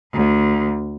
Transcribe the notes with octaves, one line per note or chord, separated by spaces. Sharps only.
D2